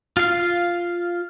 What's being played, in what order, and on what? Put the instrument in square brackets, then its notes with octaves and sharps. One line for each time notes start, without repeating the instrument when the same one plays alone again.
[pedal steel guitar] F4 F5